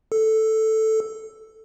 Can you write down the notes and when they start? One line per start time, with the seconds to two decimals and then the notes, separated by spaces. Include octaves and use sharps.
0.12 A4